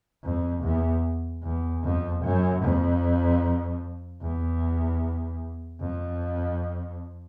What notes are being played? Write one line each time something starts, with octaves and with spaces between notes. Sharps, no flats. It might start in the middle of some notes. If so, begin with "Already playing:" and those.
F2
E2
E2
F2
F#2
F2
E2
F2